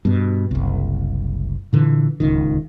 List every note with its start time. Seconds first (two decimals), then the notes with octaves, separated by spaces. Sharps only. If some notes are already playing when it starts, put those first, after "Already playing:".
0.05 G2 B2
0.51 F#1 C2
1.73 A#2 D3 E3
2.20 D1 C#2 D#3